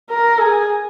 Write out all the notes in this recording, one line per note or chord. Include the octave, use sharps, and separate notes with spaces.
A#4
G#4